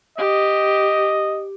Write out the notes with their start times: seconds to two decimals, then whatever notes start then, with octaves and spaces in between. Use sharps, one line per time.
0.18 G4 D#5